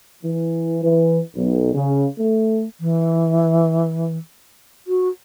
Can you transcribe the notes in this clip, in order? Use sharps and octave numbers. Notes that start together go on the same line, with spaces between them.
E3
E3
B1
C#3
A3
E3
F#4